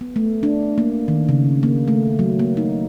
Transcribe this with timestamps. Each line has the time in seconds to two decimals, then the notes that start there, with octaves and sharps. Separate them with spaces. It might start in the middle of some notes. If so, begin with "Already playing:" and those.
0.01 B3
0.16 A3
0.43 D4
0.78 A#3
1.08 D#3
1.29 C#3
1.63 A#3
1.88 A3
2.19 F#3
2.39 A#3
2.57 D#4